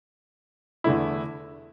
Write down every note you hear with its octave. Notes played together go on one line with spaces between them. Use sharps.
E2 D3 A3 E4